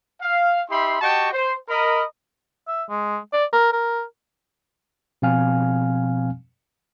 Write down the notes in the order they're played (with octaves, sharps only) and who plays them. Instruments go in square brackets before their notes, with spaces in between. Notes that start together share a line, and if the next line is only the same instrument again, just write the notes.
[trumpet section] F5
D#4 G4 E5 B5 C6
F#4 G4 D#5 G5 A5 C#6
C5
A#4 D#5 B5
[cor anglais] E5
G#3
D5
A#4
A#4
[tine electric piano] B2 F3 C4 F5 G#5 F6